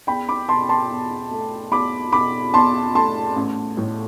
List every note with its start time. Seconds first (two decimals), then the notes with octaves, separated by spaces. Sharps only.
0.07 E2 G5 B5
0.28 B5 D6
0.49 B2 A5 C6
0.69 A5 C6
0.90 E2
1.31 A3
1.72 E2 B5 D6
2.12 B2 B5 D6
2.54 E2 A5 C6
2.95 A3 A5 C6
3.36 A1
3.77 A2